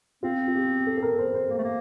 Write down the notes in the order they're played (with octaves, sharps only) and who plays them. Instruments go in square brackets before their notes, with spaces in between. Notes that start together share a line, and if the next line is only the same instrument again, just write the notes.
[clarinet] C4 [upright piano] F4
[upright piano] F4
G4
A4
A4
A#4
C5
C5
[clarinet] A#3
A3
A#3